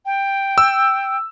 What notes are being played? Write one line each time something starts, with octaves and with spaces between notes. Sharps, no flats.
G5
E6